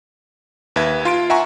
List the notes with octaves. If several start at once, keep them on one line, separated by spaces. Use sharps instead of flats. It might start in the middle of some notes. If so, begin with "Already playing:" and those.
D#2 B4 E5 G#6
F4 C6 D7
E5 F#5 G#5 A#5 C#6